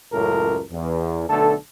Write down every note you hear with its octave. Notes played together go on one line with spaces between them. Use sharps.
C#2 F#2 A2 A4 A#4
E2
B1 D3 A3 A4